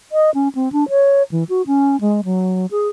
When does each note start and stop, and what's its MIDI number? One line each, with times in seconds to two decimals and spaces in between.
0.12 0.30 75
0.34 0.48 61
0.55 0.72 60
0.72 0.88 62
0.89 1.23 73
1.31 1.44 52
1.49 1.62 66
1.67 1.99 61
2.01 2.21 56
2.25 2.66 54
2.71 2.89 68